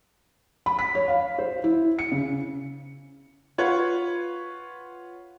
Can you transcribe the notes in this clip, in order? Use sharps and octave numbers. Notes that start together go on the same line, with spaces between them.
B5
B6
C#5
F5
C5
E4
C#7
C#3
F4 B4 C#5 F#5